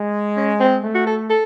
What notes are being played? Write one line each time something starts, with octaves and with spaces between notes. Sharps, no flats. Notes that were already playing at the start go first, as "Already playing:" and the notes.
Already playing: G#3
C#4
C4
A3
F#4
A4
A4